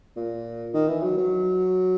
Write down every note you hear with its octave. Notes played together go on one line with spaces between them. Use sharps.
A#2
D#3
E3
F#3
F#3